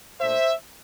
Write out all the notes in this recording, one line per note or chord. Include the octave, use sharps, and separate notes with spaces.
A#2 A3 D4 C5 E5